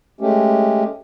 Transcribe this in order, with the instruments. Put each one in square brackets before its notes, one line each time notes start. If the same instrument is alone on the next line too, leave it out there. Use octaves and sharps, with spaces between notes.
[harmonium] G#3 A3 C#4 G4